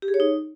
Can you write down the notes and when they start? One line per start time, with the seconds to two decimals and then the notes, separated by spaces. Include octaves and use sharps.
0.02 G4
0.08 G#4
0.14 C#5
0.20 D#4